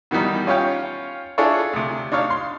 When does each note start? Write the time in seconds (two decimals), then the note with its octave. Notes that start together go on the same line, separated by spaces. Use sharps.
0.11 B2 D#3 E3 G3 D#4
0.47 C#4 F4 C#5 F5 G5
1.38 D4 E4 F4 G#4 A4 C#5
1.73 D2 C3
2.12 D4 D#4 C#5 F5
2.30 C6